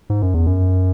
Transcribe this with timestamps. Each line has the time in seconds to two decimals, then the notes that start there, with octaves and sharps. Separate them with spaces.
0.10 G#2
0.22 F#2
0.34 E2
0.47 F#2